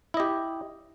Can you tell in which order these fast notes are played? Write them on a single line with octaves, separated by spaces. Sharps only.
E4 D#5 G4